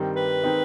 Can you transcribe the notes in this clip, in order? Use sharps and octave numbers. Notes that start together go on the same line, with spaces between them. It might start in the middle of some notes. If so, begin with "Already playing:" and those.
Already playing: G2 D#3 G3 C4
B4
D#3 G#3 C4 D#4